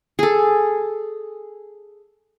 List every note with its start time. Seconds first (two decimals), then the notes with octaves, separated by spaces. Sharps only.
0.19 G#4 A4